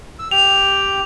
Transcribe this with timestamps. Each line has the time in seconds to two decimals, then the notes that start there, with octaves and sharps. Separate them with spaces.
0.19 E6
0.31 G4 G5 F7